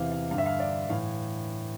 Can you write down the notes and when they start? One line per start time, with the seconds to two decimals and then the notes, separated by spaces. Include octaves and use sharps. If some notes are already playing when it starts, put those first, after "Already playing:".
Already playing: E2 C3 E3 F5
0.12 F5
0.31 G2 D3 F5
0.38 E5
0.46 F5
0.60 D5
0.89 A2 E3 F5